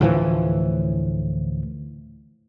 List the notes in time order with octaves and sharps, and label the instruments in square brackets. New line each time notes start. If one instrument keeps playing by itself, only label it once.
[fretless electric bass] D2 A2 E3 F3